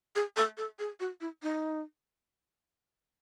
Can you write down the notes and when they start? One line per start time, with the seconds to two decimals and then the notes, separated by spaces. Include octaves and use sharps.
0.16 G#4
0.37 A4
0.57 A4
0.79 G#4
1.00 F#4
1.21 E4
1.43 D#4